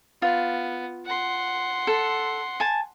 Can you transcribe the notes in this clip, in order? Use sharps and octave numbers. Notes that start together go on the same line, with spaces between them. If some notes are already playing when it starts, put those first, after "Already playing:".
B3 F4
F#5 C6
A4
G#5 A5